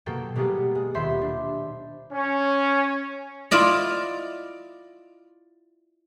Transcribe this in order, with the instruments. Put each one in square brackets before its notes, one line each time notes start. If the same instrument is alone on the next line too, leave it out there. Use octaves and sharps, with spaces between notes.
[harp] B2 F#3 A#3 A4 G5
B2 G3 G#3 A#3 B3
G#3
D#1 C5 E5 B5 C6 G6
D4
[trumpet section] C#4
[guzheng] E4 F4 D5 D#5